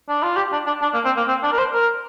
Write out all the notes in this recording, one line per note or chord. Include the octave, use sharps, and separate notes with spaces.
D4
F4
G4
D4
D4
D4
A#3
C4
A#3
C4
D4
A#4
C5
A#4